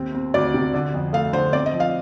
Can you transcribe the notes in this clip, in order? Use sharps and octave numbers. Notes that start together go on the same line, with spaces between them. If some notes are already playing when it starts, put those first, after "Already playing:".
Already playing: D#2 C4
C4
D2 D5
C3
D3
F2
A3 F5
D3 C5
C4 D5
D#5
F3
F5